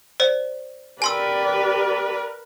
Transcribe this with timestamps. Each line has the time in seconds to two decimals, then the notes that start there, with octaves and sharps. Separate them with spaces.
0.20 C5 D5
1.02 G4 A#4 B4 D5 G#5 C6 E6